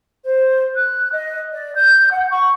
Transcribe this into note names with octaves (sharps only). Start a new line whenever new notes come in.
C5
F#6
D#5
D5
G6
F#5
C#6